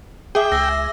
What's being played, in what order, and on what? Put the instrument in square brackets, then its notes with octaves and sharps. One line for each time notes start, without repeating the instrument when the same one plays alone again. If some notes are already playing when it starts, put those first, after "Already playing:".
[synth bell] G#4 E5 [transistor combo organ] G5 [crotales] D6 D#7
[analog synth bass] C#2 [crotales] E6 A#6 G7